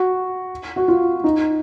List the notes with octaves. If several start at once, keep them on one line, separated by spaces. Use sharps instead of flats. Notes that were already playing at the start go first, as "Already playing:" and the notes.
Already playing: F#4
F#4
F4
D#4